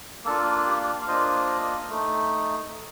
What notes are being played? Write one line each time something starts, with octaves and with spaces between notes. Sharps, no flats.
A#3 D4 F4 A4
G4
F5
A#3 D4 F4 C5 D#5
A3 D#4